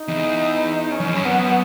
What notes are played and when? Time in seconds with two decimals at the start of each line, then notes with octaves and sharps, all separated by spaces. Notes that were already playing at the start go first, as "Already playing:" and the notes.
Already playing: D#4
0.08 E2
0.91 C#4
1.00 F#2
1.08 E2
1.16 F#2
1.25 B3